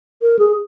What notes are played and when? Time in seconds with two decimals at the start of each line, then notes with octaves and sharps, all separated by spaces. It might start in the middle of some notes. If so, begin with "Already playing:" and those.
0.22 A#4
0.39 G#4